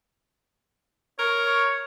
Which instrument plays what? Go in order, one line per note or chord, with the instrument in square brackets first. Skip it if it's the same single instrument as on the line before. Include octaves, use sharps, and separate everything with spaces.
[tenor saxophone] A#4 [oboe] C#5
[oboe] C#5